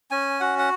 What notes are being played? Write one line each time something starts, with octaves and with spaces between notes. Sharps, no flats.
C#4 G#5
F#4 F#5
F#5